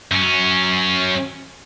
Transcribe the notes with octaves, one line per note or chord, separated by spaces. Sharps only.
F#2 C#4